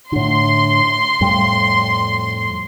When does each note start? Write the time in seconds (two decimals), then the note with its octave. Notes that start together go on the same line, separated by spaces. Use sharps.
0.12 A2 D3 C6
1.21 F2 A2 G3